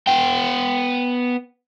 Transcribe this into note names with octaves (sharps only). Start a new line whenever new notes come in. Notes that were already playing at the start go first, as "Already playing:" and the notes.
B3 G5